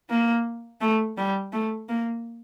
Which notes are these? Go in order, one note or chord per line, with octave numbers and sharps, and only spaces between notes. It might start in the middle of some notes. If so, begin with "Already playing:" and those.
A#3
A3
G3
A3
A#3